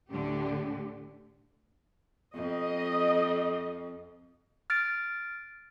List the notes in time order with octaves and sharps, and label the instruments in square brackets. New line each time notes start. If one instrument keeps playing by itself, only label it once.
[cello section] D2 A2 D3 G4
[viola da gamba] F2 [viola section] D#5
[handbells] F6 A6 D7